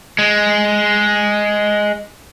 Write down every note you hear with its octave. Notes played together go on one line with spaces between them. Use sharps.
G#3